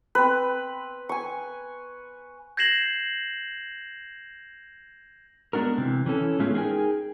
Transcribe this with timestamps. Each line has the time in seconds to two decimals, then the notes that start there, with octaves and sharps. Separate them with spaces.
0.15 C4 B4
1.09 G#5 C#6
2.57 G6 G#6 A#6 C7 E7 F#7
5.53 G#3 B3 D4 F#4 A#4
5.78 C3 E3
6.06 E3 C#4 A4
6.40 A2 G#3 A3 B3 C#4 F4
6.54 D#4 G#4 A#4 C5 G5 G#5